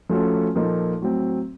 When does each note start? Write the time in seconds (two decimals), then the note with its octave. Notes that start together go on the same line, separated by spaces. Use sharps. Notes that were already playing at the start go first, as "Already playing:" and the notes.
0.10 F3 A3 C#4 F#4 A4
0.55 A#2 F3 A#3 D#4 A4
1.01 A2 F#3 C4